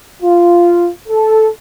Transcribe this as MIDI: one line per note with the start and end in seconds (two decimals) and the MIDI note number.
0.22 0.89 65
1.08 1.48 69